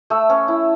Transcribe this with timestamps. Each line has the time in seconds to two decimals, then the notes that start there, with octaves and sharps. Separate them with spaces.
0.10 A3 E6
0.30 C#4
0.48 E4